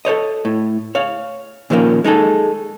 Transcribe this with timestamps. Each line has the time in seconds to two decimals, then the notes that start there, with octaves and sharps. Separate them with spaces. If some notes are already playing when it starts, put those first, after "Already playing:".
0.05 A4 C5 C#5 D#5
0.45 A2
0.95 C#5 F5
1.70 A#2 D#3 F3 A3 A#3 C#4
2.04 G#3 D#4 G#4 A4